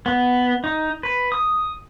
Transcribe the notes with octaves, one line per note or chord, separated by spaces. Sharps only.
B3
D#4
B4
D#6